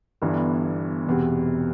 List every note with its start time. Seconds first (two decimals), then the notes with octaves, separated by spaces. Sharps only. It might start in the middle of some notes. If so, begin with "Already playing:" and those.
0.22 G1 G2 E3 B3
1.07 E1 E2 C3